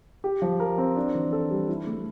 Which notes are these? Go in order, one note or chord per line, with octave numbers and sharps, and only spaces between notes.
G4
F3
A#4
C4
D4
E3
A4
G3
E4
A3